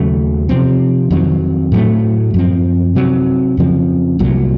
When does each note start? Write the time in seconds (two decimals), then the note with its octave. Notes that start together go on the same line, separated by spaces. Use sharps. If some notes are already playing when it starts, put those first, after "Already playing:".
Already playing: D#2 C#3 F#3 A3
0.49 C3 F3 C4
1.11 F2 D#3 F#3 C4
1.72 A2 F#3 A3
2.34 F#2 F3 C4
2.95 C3 F#3 C4
3.57 F2 C#3 F3 C4
4.19 C2 A#2 F#3